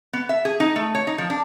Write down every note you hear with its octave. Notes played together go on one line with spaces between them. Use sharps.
B3
E5
G#4
D#4
A3
C#5
D#4
F3
D4